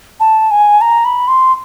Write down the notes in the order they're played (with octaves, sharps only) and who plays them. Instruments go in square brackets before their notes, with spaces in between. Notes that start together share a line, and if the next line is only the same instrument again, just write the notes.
[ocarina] A5
G#5
A#5
B5
C6